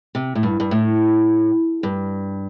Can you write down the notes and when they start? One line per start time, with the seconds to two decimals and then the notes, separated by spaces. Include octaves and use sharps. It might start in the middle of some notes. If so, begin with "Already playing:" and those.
0.15 C3
0.35 A2
0.43 G2
0.60 G2
0.71 A2
1.83 G2